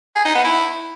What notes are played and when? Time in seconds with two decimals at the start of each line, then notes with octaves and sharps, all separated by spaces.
0.16 G#4
0.25 D#4
0.35 B3
0.44 E4